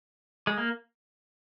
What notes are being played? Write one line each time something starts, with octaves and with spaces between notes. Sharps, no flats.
G#3
A#3